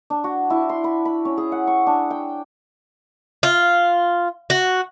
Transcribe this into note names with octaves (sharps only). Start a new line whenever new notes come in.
D4
F#4
E4
C6
B5
B5
C#4
G#4
F#5
C#6
D4
G5
F4
F#4